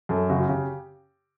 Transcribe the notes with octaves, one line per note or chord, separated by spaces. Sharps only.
F#2 A4
C#3 F#4
F#4
C#3 G4